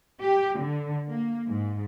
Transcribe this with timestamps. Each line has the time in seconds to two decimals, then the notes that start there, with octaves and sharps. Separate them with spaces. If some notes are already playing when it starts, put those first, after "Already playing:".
0.21 G4
0.60 D3
1.10 A#3
1.49 G#2